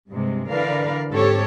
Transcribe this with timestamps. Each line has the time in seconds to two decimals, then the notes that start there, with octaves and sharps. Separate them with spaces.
0.11 G2 C3 G#3
0.51 D3 E3 A#4 B4 D5 F5
1.12 G#2 C4 G4 A4 C#5